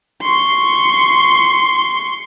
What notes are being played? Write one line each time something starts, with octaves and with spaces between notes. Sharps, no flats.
C6 C#6